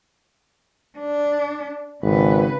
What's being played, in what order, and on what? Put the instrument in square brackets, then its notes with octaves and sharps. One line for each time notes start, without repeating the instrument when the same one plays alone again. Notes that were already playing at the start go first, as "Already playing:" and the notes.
[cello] D4
[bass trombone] G#1 [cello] C#3 B4